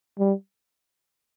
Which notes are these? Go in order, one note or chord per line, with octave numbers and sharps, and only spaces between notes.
G3